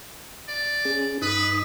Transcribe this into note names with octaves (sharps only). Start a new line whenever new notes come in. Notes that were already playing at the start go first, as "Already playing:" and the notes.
D5
C#4 G#4
G2 D#4 B4 D#6